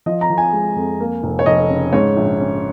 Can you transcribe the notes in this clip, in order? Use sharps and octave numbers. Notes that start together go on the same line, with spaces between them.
F3 D#5
A#5
F3
G#5
G#3
F2
A#3
F1
C#5
F1 D#5
C#3
G#2 C#5
A#1
C#4